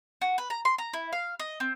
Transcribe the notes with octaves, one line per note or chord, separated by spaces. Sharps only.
F#4
B4
A#5
C6
A#5
E4
F5
D#5
C4